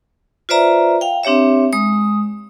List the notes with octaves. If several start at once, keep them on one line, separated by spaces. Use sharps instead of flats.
F4 B4 C5 D5 E5 A#5
F5 G5
C4 D4 G4 C#5 E5
G#3 D#6